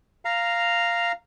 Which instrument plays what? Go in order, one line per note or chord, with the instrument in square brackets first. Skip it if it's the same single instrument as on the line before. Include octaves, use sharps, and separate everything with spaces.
[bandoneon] F5 A#5